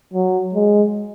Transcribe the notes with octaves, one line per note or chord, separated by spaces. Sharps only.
F#3
G#3